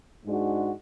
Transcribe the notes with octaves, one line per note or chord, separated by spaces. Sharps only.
G#2 G#3 D4 F#4